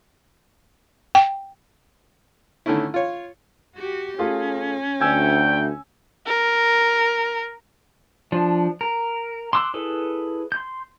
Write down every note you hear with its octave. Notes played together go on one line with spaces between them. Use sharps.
G5
D3 D#3 A3 C#4 E4
F4 C#5
F#4 G4
A3 C#4 F4 G#4
D2 G5 G#5 E6 G#6
A#4
F3 D4
A#4
C6 D6 E6 F#6
E4 G#4 A4 B4
C6 G6